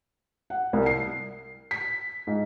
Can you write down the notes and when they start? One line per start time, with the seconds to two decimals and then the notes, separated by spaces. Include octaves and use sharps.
0.50 F#5
0.73 C2
0.86 C7
1.71 B6
2.27 G#2